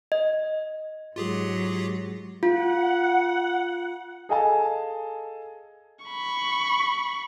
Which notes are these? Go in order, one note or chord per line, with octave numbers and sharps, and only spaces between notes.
D#5
G#2 F#3 F4 G4 G#4
F4 F#5
G#4 A4 D#5 F5 G#5 A5
B5 C#6